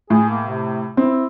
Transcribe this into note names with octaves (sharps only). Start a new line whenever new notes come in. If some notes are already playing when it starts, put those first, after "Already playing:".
A2 G#4
A#3
C3
C4 E4